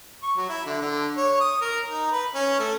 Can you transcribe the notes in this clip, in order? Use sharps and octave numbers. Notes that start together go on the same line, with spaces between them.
C#6
F#3
E4
D3
D3
C#5
D#6
A#4
D#4
B4
C#4
A3